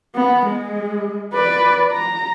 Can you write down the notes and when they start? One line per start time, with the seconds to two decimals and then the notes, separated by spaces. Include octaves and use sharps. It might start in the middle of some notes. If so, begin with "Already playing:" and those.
0.15 B3
0.46 G#3
1.33 B4 D5
1.92 A#5